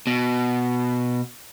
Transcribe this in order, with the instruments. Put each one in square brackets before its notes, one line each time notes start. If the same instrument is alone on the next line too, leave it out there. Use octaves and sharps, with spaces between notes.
[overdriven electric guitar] B2